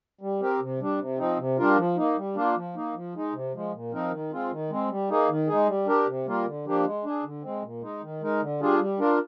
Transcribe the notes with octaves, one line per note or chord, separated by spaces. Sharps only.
G3
C4 G4 A#4
C3
G3 D4
C3
F3 C4 D#4
C3
G3 D4 F4 A#4
F3
A#3 D#4
G3
A#3 D4 F4
F3
A#3 D#4
F3
G#3 D#4
C3
F3 G#3
A#2
F3 C4 D#4 A#4
D#3
G#3 C4 F4
D#3
G#3 C4
G3
A#3 D#4 G#4
D#3
G#3 D#4 G#4
G3
D4 G4 A#4
C3
G3 A#3 F4 A#4
D3
F3 A#3 D4 G4
G#3
D4 G#4
D3
G#3 C4
A#2
G#3 D#4
D#3
G#3 D#4 A#4
D3
G3 D4 F4 G#4
G3
D4 F4 A#4